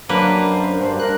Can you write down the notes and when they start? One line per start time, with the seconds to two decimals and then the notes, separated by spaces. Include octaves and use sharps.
0.09 F#2 A#3 D4 B4 C5 B5
0.81 G2 C5
1.00 A#4 F#6